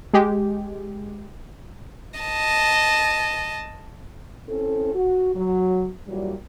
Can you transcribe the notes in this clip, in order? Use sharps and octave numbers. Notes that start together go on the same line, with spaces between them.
G#3 G4
D#5 A5
C4 C#4 E4 A4
F#4
F#3
A#2 E3 F#3 G3